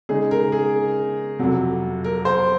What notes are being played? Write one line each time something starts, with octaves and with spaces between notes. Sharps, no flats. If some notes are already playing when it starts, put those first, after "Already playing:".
C#3 G#3 D#4 G#4
A#4
G#4
F2 C3 F#3
A#4
C5